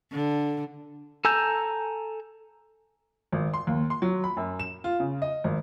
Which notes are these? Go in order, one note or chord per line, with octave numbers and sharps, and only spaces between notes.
D3
A4 G#5 A#5 E6 G6
G#1
C6
D#2
C6
F#3
B5
F#2
E7
F4
C#3
D#5
G#1